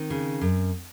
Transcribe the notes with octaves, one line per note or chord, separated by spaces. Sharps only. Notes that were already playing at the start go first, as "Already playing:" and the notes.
Already playing: D#3 C4
C#3
F#2